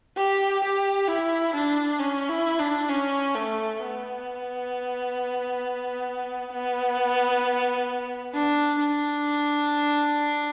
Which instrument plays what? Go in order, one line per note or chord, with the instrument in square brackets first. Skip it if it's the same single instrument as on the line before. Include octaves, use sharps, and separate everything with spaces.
[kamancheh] G4
G4
E4
D4
C#4
E4
D4
C#4
A3
B3
B3
D4
D4